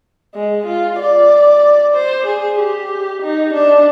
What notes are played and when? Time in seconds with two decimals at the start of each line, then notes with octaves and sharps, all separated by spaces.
0.35 G#3
0.67 F4
0.99 D5
1.95 C5
2.27 G#4
2.59 G4
3.22 D#4
3.54 D4